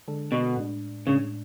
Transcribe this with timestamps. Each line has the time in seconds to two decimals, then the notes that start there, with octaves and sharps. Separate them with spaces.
0.08 D3 G#3 D4 A4
0.32 B2
0.57 A2 G#3 D4
1.06 A2 C#3 G#3 D4